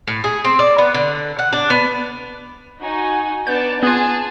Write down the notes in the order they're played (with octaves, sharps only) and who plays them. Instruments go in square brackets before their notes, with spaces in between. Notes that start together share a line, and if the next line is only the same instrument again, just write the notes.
[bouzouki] A2
G#4
C4
D5
B3
D3
F#5
D4
B3
[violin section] D#4 F#4 G#5
[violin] B3 [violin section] D4 D5 A5 [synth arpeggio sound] G6
[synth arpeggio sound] B3 F4 [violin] G#4 [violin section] G#5 A5